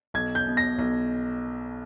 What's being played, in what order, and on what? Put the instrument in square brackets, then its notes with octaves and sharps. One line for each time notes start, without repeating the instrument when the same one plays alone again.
[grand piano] B1 G#6
G6
B2
A#6
B1